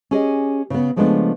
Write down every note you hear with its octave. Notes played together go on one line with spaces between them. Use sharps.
C#4 G4 G#4 C#5 D#5
C#3 B3
C#3 F3 G#3 A3 B3 D4